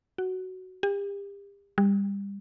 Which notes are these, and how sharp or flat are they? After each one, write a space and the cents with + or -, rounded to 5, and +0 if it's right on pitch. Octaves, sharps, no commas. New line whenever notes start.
F#4 +5
G4 +35
G3 +25